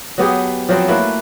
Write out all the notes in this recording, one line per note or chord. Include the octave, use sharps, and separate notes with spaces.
F#3 B3 G4 G#4
F3 F#3 B3 C4
A3 A#3 E4 B4